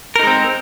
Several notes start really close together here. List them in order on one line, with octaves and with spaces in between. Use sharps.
A#4 D#4 G#3 C4